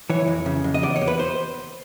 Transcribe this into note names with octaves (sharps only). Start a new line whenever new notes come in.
E3 C#5
F2
C#3
F2
D#5
E2 D5
C#5
E2
B4
C5